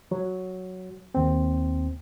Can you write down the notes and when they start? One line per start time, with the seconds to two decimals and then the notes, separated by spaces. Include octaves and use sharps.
0.11 F#3
1.15 D#2 C4